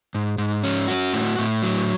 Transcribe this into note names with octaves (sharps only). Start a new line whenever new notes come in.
G#2
G#2
C#4
F#4
A2
A2
F#3